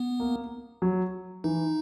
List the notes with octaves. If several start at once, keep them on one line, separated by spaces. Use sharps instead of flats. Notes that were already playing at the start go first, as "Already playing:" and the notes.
Already playing: B3
A#3
F#3
E3 D#4